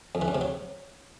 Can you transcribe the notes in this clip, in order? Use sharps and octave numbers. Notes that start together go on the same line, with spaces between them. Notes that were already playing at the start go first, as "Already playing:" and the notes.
F2
E3
F#2
C3
F#3